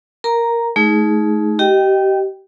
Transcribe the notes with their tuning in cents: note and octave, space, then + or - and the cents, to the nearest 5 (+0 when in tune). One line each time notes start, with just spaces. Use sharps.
A#4 +0 A#5 +0
A3 -35 D#4 +20 G#4 +0
G4 -30 D#5 +0 G5 +0